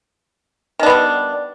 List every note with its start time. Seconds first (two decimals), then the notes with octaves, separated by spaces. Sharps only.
0.79 D#3
0.83 D4
0.86 B3
0.90 G3